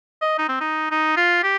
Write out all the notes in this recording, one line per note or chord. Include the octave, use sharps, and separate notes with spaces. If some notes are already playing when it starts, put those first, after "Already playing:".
D#5
D#4
C4
D#4
D#4
F4
G4